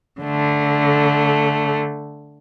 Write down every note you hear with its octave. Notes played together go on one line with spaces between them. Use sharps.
D3 A3